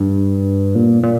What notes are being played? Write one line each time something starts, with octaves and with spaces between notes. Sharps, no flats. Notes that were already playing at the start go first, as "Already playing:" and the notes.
Already playing: G2
A#2
A#2